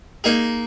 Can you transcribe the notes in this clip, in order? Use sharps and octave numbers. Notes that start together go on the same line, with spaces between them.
A#3 D#4 G#4